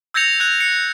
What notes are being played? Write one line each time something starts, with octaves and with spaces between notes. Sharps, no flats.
E6 G6 G#6 A#6 C#7 F7
F#6 G#6 F7
C#7